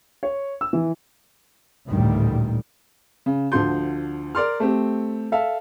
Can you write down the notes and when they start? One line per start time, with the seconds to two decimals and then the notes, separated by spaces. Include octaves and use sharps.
0.23 C#5
0.61 E6
0.73 E3
1.88 A1 D2 A#2 D#3 G3
3.26 C#3
3.52 D2 D3 F3 C6 G6
4.35 A#4 D5 C6 F6
4.60 A3 C4 G4
5.32 A4 E5 F5